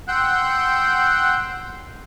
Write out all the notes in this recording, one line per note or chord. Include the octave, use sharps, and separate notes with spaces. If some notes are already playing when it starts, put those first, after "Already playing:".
F#5 G5 C6 E6 F#6 G6